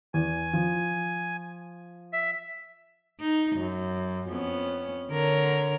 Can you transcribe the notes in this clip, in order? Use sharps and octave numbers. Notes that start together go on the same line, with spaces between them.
E2 G#5
F3
E5
D#4
F#2
F2 B3 C#4
D3 A#4 C#5